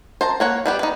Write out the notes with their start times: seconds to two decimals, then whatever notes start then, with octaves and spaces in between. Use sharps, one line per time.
0.21 C5 A5 A#5
0.40 A#3 C#5 F#5
0.66 G3 B3 G4
0.79 B3 D#4